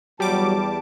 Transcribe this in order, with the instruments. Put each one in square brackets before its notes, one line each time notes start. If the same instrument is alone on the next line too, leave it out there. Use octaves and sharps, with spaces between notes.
[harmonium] E2 A5 [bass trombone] F#3 [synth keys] G3 D6